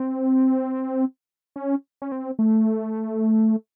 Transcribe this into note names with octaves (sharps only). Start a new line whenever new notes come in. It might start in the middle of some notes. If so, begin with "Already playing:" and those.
Already playing: C4
C#4
C#4
C4
A3